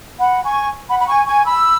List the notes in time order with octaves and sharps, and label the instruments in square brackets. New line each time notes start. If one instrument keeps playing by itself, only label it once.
[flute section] F#5 B5
G#5 C#6
F#5 B5
B5
G#5 C#6
G#5 C#6
B5 E6